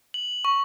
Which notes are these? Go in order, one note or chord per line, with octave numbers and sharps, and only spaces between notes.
F#7
C#6